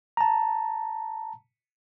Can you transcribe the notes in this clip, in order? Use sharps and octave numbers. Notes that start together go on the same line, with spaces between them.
A5 A#5